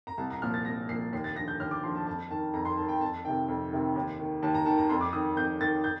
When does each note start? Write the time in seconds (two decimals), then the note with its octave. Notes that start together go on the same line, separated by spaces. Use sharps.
0.07 A#5
0.18 C2 A5
0.30 A#5
0.42 A#2 F3 F6
0.54 A6
0.65 C2 A#6
0.89 A#2 C7
0.92 F3
1.13 D#2 C7
1.24 A6
1.35 D3 F3 A#6
1.48 G6
1.60 D#2 F6
1.71 D6
1.83 D3 F3 C6
1.95 A5
2.07 F2 A5
2.31 D#3 A5
2.53 F2 A#5
2.65 C6
2.77 D#3 A5
2.89 G5
3.01 F2 A5
3.25 C3 D#3 G5
3.48 F2
3.71 C3 D#3
3.96 D#2
4.19 D#3
4.43 D#2 A5
4.54 A#5
4.66 D#3 A5
4.78 A#5
4.89 F2 C6
5.01 D6
5.13 D#3 D#6
5.36 F2 G6
5.61 D#3 A6
5.84 G6